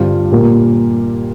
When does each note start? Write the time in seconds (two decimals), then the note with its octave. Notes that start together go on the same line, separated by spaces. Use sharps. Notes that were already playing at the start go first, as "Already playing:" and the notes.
Already playing: G2 D3 G3 C4 F4
0.31 A#2 G3 A#3